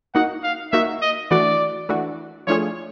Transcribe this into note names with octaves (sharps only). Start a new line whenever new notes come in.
A#3 D#4 F#4 F#5
F5
A#3 D#4 F#4 E5
D#5
E3 A3 D4 F#4 D5
E3 A3 D4 F#4
F3 A3 D4 F4 G#4 C#5